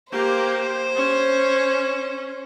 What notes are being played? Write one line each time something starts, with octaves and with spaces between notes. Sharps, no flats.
A#3 G4 C5
C#4